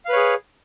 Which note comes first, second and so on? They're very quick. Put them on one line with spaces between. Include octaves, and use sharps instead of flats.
F5 B4 C#5 G#4